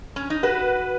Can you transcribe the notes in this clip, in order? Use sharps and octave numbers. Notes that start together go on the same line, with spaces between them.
C#4
D#4
F#4 B4